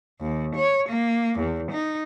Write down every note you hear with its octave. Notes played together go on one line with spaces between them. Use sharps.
D#2
C#5
A#3
E2
D#4